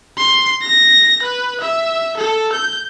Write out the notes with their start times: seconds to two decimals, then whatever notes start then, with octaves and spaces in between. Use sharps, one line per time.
0.18 C6
0.62 A#6
1.23 B4
1.60 E5
2.17 A4
2.53 G6